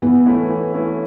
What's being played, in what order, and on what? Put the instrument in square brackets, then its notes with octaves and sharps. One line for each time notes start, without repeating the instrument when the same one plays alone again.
[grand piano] E3 [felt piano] B3
[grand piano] A3 C#4 E4
E3
A3 C#4 E4